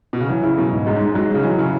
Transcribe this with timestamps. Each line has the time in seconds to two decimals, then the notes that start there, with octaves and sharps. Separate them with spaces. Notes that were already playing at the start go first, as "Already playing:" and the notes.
0.13 B2
0.20 C#3
0.29 E3 F#3
0.43 C#3 E4
0.57 B2 F#3
0.72 G#2
0.86 F#2 G#3
0.96 G#2
1.01 G#3
1.06 G#2
1.15 F#3 G#3
1.30 C#3 G#3
1.43 E3 F#3
1.58 C#3 E4